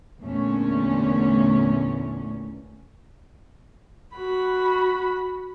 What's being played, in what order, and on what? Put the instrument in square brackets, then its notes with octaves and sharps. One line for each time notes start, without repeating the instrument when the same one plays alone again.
[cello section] E2 A#2 D3 A3 C#4
[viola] F#4 B5